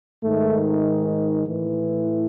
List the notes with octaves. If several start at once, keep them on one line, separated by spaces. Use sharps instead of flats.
G#2 D#3 A3
A2 E3